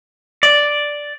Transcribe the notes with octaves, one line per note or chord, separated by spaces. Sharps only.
D5